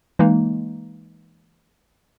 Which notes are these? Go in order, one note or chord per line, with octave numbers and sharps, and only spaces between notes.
E3 G#3 A#3 D#4